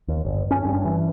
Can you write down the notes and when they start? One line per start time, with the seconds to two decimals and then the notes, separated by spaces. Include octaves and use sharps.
0.08 D#2
0.25 G1
0.51 C#4
0.65 G2
0.85 E3